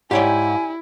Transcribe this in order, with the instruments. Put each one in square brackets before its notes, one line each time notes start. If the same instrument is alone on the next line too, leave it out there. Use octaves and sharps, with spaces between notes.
[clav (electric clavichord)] G#2 [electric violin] E4 [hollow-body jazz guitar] G4 C#5 D5 [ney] G#5